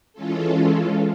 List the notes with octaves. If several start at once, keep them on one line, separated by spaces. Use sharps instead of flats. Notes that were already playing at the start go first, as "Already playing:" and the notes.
E3 G#3 C#4 F4 A4